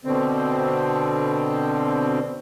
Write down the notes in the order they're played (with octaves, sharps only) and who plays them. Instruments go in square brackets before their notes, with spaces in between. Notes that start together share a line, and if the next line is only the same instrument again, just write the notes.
[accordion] B2 D3 C4